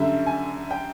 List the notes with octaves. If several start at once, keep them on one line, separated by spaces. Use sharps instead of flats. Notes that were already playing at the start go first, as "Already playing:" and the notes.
Already playing: F#2 D3 G3 E5
G#5
G5